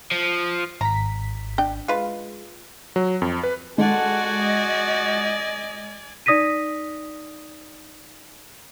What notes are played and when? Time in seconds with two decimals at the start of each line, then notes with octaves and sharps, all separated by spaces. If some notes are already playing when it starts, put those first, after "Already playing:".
0.12 F3
0.81 G#1 A#5 B6
1.58 D4 G5
1.88 G#3 F4 B4
2.96 F#3
3.22 F2
3.43 B4
3.78 G#3 F#4 A4 D5 F#5 G#5
4.41 D#5
6.26 D#4 D5 D#6 A#6 B6 D#7